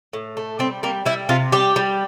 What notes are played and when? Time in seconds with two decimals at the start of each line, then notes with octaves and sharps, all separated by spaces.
0.13 A2
0.37 A3
0.59 G3 C4
0.83 G3 A#3
1.05 G3 E4
1.29 C3 F4
1.52 G3 G4
1.76 G3